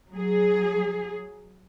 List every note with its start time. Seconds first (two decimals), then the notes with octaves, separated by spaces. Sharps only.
0.13 F#3 G#4